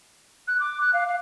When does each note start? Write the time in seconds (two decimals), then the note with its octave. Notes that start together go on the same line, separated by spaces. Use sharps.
0.48 F#6
0.60 D6
0.82 F#6
0.93 F5
1.08 F5